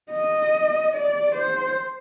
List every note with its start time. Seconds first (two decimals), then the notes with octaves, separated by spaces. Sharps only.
0.11 D#5
0.94 D5
1.35 C5